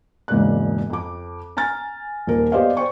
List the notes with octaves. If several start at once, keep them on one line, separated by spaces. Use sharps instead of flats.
E1 G#2 C#3 A#3 D5 F#6
F2 D6
G#5 A#5 F6 A6
D#1 A#2 A#4
B3 G4 C5 D5 D#5 F5
C5 D5 G5 C#6